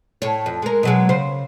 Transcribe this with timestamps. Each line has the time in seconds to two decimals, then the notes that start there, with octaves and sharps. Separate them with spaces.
0.22 A2 C#5
0.46 F2
0.62 G#3 A#4
0.83 B2 F#3 G#3
1.09 C#3 C5